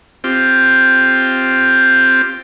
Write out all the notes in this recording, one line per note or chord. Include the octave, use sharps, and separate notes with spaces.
C4 F4 G4